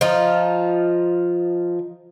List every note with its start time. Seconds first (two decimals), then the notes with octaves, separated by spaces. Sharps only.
0.01 F3 D#4 F4